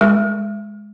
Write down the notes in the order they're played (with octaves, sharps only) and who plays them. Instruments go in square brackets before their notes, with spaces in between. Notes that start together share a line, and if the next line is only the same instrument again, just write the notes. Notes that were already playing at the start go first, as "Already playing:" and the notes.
[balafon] G#3